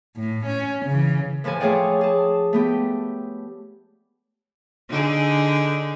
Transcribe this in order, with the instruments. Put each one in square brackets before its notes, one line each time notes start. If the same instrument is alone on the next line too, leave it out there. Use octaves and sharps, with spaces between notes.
[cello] A2
C#4
C#3 E3
[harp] A2 E3 F3 A4 G#5
A3 F4 G#4 C#5 D5 G5
G#4 A5
A3 B3 G4
[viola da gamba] D3 D#4 G#4